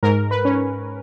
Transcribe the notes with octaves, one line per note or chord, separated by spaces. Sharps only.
G#2 A#4
B4
C#4